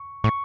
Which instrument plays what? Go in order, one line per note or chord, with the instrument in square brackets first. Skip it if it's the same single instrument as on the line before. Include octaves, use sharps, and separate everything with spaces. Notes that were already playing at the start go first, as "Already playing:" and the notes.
Already playing: [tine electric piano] C#6
[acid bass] A2 [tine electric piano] C#6